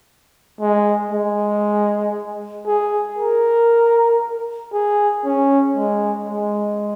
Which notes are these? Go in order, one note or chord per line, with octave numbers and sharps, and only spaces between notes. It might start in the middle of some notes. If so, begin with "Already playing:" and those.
G#3
G#3
G#4
A#4
G#4
C#4
G#3
G#3